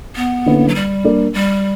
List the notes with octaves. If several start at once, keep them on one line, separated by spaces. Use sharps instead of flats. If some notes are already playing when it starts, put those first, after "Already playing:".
B3
D3 A#3 C#4 E4 B4
F#3
G3
A#3 D4 A#4 D5
G3